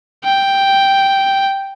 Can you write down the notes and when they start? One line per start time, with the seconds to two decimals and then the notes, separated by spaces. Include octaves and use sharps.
0.24 G5